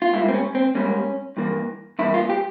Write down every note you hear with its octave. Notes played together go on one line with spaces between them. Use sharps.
F4
G#2 G3 A#3 E4
C4
C#4
C4
G#2 G3 A#3 C#4
G2 E3 A#3
G2 E3 A#3 E4
F4
G4